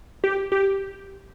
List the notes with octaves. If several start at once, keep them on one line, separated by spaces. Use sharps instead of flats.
G4
G4